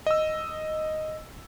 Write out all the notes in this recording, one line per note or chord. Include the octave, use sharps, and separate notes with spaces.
D#5 E6